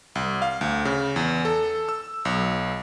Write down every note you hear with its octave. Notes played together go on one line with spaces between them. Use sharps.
C2
F5
D2
C#3
E2
A4
E6
B1